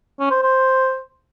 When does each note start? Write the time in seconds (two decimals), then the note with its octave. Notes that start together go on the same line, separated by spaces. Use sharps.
0.19 C#4
0.31 C5
0.42 C5